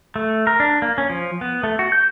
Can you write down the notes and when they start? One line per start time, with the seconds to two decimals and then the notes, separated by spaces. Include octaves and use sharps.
0.16 A3
0.47 A#4
0.60 D4
0.82 A#3
0.98 C#4
1.10 F3
1.41 B3
1.64 A3
1.79 F#4
1.92 G6